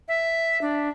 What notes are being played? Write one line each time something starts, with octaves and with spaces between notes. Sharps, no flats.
E5
D4